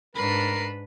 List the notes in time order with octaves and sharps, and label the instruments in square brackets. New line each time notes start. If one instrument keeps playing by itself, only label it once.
[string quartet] G#2 D4 [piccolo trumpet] A#4 [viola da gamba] B4 [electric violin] B5 C7